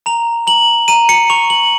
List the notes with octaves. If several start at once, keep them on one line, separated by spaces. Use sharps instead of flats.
A#5 F7
A#5 F#7
A#5 D#7
C#7
C#6 F7
F#7